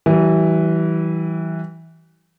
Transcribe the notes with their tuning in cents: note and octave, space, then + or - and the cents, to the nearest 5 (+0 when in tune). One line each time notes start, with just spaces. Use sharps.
E3 -15 G3 -45